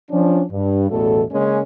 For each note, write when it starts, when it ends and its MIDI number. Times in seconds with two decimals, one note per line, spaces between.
0.11 0.43 53
0.11 0.43 61
0.11 0.43 62
0.52 0.89 43
0.90 1.23 33
0.90 1.23 40
0.90 1.23 47
0.90 1.23 54
0.90 1.23 57
0.90 1.23 69
1.31 1.61 49
1.31 1.61 56
1.31 1.61 58
1.31 1.61 61